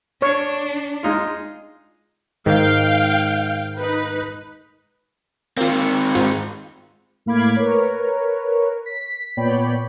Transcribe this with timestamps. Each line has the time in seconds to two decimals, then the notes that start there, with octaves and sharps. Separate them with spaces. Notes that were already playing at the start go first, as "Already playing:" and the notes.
0.22 D4 C#5
1.03 G#3 D#4 F4
2.46 G#2 D#3 F5 G5
3.77 D#4 B4
5.57 D#3 A#3 C4 F4
6.15 G#2 F4
7.26 A2 A#3 F5 B5 D6 G#6
7.56 A#4 B4 C#5
8.86 B6
9.37 A#2 B3 C#5 D5 G5 B5